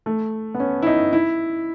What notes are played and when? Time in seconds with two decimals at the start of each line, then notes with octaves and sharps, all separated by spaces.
0.06 A3
0.54 B3
0.60 C#4
0.82 E4
0.86 D#4
1.13 E4